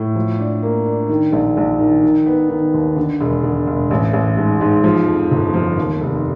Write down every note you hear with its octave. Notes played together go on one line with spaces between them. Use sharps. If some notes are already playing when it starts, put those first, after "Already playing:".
Already playing: A2
F3
D4
A#3
D4
D#3
A#1
A#1
D#3
D#3
B3
D#3
D#2
D3
E1
D3
E1
A1
A1
G#2
G#2
F3
F2
G1
F3
D#2
F1